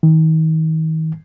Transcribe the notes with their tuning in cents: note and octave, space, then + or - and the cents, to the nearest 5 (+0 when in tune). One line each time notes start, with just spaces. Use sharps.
D#3 +35